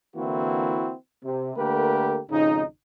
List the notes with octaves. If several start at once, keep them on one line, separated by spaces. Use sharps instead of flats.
D3 E3 A#3 C4 E4 F#4
C3
D3 A3 A#3 G4 A#4 B4
G#1 F2 C#3 D#4